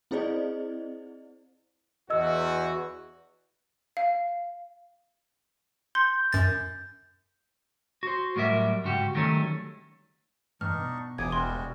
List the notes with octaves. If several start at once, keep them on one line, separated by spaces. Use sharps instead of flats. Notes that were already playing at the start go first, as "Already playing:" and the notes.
C4 E4 G#4 C5 D5 D#5
E2 F#4 D#5 E6
F5
C6 G6
F#2 A6
F#4 C5
A2 F#3 G3 A#4 E5
G#2 C#3 F#4 G4
D#3 F#3 G3 A3 C#4
E2 G2 D4 D#4 C#6 F6
B2
E1 G#5 D6 D#6 G#6
G3 G#3 F#4 C6